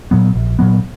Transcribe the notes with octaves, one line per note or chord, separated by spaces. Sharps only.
A#2 F#3 B3
A#1
A#2 F#3 B3